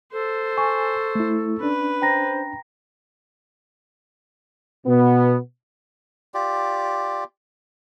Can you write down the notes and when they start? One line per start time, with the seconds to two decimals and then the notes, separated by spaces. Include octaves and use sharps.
0.12 A4 C5
0.57 G#5 C#6
1.15 A3 E4
1.60 C#4 D4 B4
2.02 C5 G5 A#5 A#6
4.86 B2 B3
6.34 F4 G4 D5